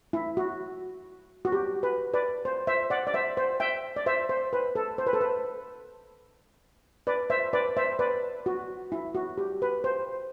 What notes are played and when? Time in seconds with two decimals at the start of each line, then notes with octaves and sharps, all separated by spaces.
0.13 E4
0.37 F#4
1.45 F#4
1.52 G4
1.83 B4
2.13 B4 D5
2.45 C5
2.67 C5 E5
2.90 D5 F#5
3.07 D5
3.14 C5 E5
3.37 C5
3.60 E5 G5
3.96 D5
4.06 C5 E5
4.29 C5
4.53 B4
4.75 A4
4.98 C5
5.07 B4
5.13 A4
5.21 B4
7.07 B4 D5
7.30 C5 E5
7.53 B4 D5
7.77 C5 E5
7.99 B4 D5
8.46 F#4
8.92 E4
9.15 F#4
9.38 G4
9.62 B4
9.84 C5